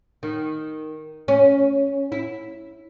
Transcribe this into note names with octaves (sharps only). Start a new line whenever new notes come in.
D#3
C#4
E4